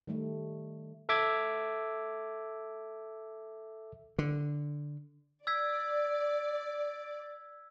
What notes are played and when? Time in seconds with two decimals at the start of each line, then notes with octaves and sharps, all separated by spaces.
0.07 D#3 G3 A3
1.09 A4 E5 D6 G#6
4.18 D3
5.47 D5 E6 G#6 B6